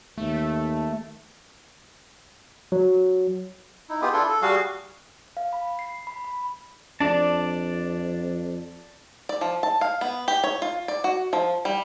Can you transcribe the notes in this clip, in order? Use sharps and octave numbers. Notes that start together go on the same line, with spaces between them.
D#2 A3
F#3
D#4 E4
B3 F4 G4 G#4
D4 E4 F4 A4
A4
G3 F#4 G#4 F5
F5
B5
C7
B5
B5
F2 D4 D5 A5
D5
F3
A5
F5
B3
G4
C#5
F4
D5
F#4
F3
G3